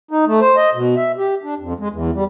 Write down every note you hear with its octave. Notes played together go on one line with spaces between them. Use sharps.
D#4
A3
C5
D#5
B2
E5
G4
D4
F2
G#3
E2
G3